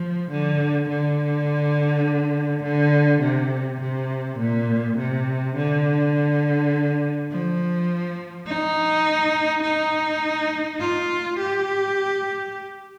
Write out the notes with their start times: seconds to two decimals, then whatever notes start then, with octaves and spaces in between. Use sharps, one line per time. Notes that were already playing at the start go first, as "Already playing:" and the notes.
Already playing: F3
0.31 D3
0.89 D3
2.64 D3
3.22 C3
3.81 C3
4.39 A#2
4.98 C3
5.56 D3
7.30 F3
8.47 D#4
9.63 D#4
10.80 F4
11.39 G4